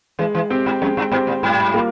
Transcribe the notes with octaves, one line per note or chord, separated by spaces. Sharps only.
E3 G#3
E3
C4 G4 C5
G#2
F2 G#3
G2
G#2 C4 G4 C5
A#2
G#2 G3
A#3 F4